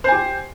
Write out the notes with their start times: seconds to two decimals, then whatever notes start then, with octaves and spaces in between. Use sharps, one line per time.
0.04 C5
0.08 G#5
0.12 G4